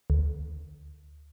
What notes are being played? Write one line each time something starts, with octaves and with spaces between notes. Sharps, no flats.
D2